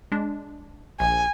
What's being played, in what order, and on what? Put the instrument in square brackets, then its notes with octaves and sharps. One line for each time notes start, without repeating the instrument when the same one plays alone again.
[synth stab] G#3 D4
[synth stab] A#1 [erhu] G#5